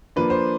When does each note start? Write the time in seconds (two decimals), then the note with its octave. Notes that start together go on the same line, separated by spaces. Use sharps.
0.16 F3 A#3 D4 B4
0.30 C5